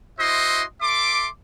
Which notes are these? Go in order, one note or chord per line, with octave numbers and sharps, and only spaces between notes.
E4 F#4 C5 D#5 E5 C6
A4 E5 C6 D6